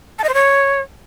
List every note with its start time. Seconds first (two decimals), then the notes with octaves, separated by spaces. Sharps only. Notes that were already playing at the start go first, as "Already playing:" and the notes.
0.19 A5
0.24 D#5
0.29 C5
0.34 C#5